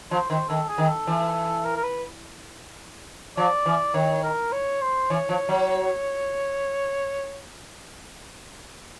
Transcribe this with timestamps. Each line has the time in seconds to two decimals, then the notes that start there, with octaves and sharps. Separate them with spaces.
0.11 F3 C5
0.30 D#3 C5
0.49 D#3 A4
0.68 G#4
0.78 D#3
0.87 A4
1.07 E3
1.64 A#4
1.76 A#4
1.83 B4
3.37 F3 D5
3.66 E3
3.94 D#3 C#5
4.23 A#4
4.52 C#5
4.81 C5
5.10 E3 C#5
5.29 F3
5.49 F#3